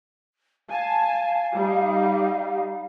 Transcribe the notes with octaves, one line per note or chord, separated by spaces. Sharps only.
F5 G#5 A5
G3 D#4